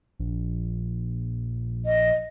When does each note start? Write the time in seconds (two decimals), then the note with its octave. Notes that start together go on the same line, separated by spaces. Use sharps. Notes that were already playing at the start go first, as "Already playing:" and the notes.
0.20 A#1
1.86 D#5